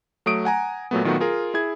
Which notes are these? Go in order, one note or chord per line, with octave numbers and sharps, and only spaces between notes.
F#3 A3 D#6 D7
F#5 G#5 A#5
A#2 F#3 A3 B3
A#2 D#3 F#3 A3 B3 F#4
F4 G#4 A#4
E4 G#4 G#6